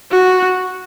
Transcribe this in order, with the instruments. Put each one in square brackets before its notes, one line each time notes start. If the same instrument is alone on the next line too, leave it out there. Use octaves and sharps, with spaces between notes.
[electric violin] F#4